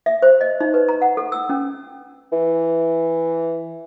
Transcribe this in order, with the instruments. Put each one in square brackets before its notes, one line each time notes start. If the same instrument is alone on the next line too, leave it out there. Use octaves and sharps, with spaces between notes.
[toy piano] E5
C5
D#5
D#4
B4
A#5
F#5
A4
E6
C#4
[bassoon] E3